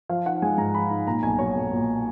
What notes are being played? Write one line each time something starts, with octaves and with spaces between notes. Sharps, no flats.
F3 F5
D#4 F#5
G#3 G#5
G#2 A#5
F3 B5
D#4
A#2 A#5
B1 G#5
F#3 C#5
B1
A#2